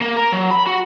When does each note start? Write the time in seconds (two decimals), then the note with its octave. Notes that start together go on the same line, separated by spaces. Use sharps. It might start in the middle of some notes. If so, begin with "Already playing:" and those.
0.02 A#3
0.17 A#4
0.32 F#3
0.51 B5
0.67 F#4